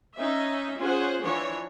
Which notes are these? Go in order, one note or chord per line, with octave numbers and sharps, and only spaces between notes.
C#4 D#4 E5
C#4 F4 G#4 C5 F#5
E3 F3 D4 C#5